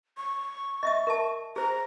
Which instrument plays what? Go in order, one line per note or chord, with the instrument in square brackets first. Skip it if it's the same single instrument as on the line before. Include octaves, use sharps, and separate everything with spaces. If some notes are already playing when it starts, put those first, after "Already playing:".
[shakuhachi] C#6
[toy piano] D#5 E5 D#6
A#4 E5 A5
[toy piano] G#4 C5 [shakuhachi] A#5